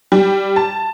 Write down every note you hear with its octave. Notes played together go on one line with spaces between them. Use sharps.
G3
A5